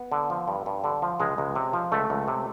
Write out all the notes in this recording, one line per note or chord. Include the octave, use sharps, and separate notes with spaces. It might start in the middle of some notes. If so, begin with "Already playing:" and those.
Already playing: B3
D3
F3
G2
G2
D3
F3
C#2 G#3
C#2
C3
F3
C#2 A3
C#2
C3